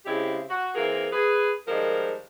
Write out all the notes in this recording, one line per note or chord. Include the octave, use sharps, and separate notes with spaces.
C#3 G#3 C4 E4 G4
F#4
E3 A#3 C4 F4 G#4 A#4
G#4 B4
D#3 F3 G3 G#3 A#4 C5